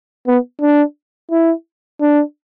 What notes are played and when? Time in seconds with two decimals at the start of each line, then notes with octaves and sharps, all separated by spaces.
0.27 B3
0.61 D4
1.31 E4
2.00 D4